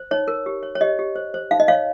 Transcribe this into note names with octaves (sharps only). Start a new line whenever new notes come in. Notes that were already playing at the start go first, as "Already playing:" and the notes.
Already playing: C5
D#4 C#5
A#4
G4
C#5
C#5
G4 D#5
G4
C5
C5
D#4 F5
D#5
C#5 F5